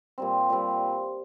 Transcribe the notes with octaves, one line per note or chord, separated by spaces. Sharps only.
A#2 G3 C4
A#2 G3 C4